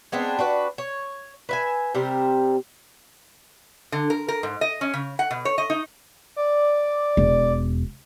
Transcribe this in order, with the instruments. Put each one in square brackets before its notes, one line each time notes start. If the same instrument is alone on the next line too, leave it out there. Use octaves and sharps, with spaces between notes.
[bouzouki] G#3 B3 C4 D4
D4 F#4 B4
C#5
B4 E5 G#5
C3 G3 C4 A#4
[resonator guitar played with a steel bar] D3
A#4
A#4
G#2
D#5
C#4
C#3
F#5
B2
C#5
D#5
D#4
[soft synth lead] D5
[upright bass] E1